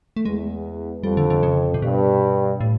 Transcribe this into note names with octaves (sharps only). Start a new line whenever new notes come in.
A3
E2 G#3
F2 G3
D3
D3
C#3
C3
G2 B2
A2